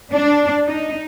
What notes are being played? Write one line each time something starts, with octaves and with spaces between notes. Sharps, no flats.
D4
D#4